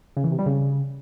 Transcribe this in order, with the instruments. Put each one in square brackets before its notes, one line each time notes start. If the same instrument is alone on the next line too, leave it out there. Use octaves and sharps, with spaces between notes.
[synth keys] C#3
E3
C3
G3
C#3